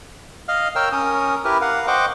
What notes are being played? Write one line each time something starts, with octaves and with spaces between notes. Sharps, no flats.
D#5 F5 F6
A#4 C#5 G5 E6 F6
C#4 A#4 D#6
E4 G4 A#4 B4
A#4 F5 F#5
C5 D#5 F#5 G5 C#6 D6